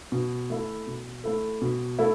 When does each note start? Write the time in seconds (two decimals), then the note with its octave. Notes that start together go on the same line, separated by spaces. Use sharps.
0.12 B2
0.50 A3 E4 A4
0.87 B2
1.24 A3 E4 A4
1.62 B2
1.99 A3 E4 A4